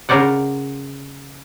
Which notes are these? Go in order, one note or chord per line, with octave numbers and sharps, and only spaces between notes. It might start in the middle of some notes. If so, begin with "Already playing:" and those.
C#3 A#4 C5 D5 F#5